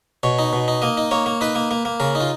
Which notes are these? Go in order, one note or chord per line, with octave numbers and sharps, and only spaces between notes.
B2 C#5
D#4
B2
D#4
A#3 D#5
D#4
A#3 C#5
A#3
D#4 B4
A#3
A#3
A#3
C#3 A#4
D#4
F4